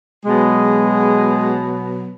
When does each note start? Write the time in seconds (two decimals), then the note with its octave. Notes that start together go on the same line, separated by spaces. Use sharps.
0.25 B2 F#3 G#3 B3 G#4